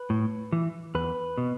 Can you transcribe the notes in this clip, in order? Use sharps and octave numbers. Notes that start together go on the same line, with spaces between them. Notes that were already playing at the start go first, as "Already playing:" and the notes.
Already playing: B4
A2
E3
E2 B4
B2